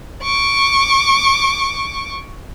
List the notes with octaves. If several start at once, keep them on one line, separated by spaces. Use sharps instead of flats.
C#6 D6